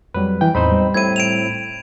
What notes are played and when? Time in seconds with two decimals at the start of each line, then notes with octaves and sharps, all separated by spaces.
0.14 F2 F#3 G3 B4
0.41 E3 G5
0.55 E2 A2 C4 D#4 C5 B5
0.71 G3
0.94 A2 C4 E4 G#6 D#7
1.16 D7 E7 F7